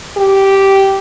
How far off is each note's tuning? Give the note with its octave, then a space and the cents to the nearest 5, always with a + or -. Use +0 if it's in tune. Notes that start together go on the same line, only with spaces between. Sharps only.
G4 -10